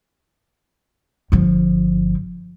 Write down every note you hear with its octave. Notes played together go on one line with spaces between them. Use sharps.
G1 F3